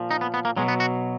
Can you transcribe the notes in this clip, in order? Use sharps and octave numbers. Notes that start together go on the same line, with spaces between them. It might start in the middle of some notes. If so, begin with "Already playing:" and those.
Already playing: A#2 F3
D#4
B3
B3
A#3
B2 F#3 G#3
B3
F#4